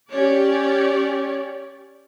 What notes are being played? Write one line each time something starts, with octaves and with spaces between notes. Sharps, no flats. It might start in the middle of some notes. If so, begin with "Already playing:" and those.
C#4 G4 C#5 D5